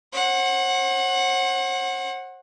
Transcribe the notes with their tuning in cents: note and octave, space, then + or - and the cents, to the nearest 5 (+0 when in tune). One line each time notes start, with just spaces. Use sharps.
C5 +45 F#5 +0